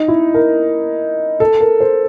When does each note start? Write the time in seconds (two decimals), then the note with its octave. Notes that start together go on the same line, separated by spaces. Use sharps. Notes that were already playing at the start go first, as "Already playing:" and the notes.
Already playing: D#4
0.08 E4
0.34 A#4
1.40 A4
1.61 A#4
1.80 C5